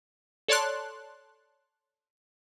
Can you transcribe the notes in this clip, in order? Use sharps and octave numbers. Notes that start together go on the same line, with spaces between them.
A4 C#5 D5 A5 C6 F#6